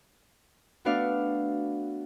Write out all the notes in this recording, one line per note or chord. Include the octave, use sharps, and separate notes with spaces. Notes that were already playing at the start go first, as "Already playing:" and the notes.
A3 B3 D4 F#4 D5 F5